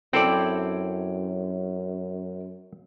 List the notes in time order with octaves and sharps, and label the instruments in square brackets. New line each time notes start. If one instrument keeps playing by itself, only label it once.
[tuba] F#2 [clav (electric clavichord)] C4 A4 D5 [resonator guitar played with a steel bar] E4 G5